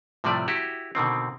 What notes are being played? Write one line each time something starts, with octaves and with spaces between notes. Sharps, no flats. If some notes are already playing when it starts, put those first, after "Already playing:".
A2 C3 F3 G3 A3 D5
E4 F#4 G4
B2 D3 D#3 C4